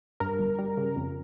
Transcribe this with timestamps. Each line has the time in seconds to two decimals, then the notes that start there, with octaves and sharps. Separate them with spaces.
0.20 G2 A#4
0.39 G1
0.59 G3
0.77 C#3
0.96 F2